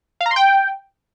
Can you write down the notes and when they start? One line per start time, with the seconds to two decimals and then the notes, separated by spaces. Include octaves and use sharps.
0.21 F5
0.26 A#5
0.31 C6
0.36 G5